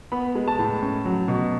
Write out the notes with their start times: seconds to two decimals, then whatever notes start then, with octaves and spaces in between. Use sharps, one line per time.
0.12 B3 B5
0.35 G#3
0.48 A5
0.59 A2
0.82 C#4
1.05 F#3
1.28 B2